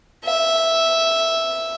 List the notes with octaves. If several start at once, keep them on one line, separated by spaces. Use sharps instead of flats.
E5